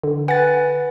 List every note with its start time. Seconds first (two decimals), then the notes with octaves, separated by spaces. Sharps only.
0.03 D3
0.28 B4 F#5 G#5 A6